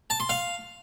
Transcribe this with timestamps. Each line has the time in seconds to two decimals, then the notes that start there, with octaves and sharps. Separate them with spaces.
0.10 A5
0.20 C6
0.29 F5